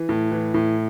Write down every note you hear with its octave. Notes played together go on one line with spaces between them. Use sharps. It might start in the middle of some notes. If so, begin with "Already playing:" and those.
Already playing: E3
A2
E3
A2